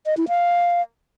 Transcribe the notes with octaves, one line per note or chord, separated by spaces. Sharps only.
D#5
E4
F5